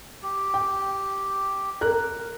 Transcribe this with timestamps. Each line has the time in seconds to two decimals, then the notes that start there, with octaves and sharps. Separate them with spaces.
0.22 G4
0.54 G5
1.81 A#4 F#6